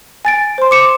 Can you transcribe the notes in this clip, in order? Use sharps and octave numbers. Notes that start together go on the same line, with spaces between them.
G#5 A6 D7
C5 C6
D6 C#7 E7